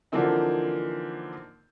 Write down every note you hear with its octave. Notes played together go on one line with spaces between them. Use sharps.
D3 E3 F3 A#3 C4 D#4